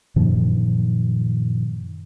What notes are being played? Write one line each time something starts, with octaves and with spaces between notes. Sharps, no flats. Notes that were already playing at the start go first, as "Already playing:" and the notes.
F#2 A#2 D#3 F3